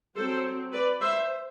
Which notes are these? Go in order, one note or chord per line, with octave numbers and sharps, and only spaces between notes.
F#3 C4 A4 C5
B4 D5
C5 E5